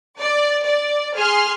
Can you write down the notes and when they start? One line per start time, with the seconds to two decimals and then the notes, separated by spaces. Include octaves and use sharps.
0.19 D5
0.65 D5
1.17 G#4 G#5 C6 F6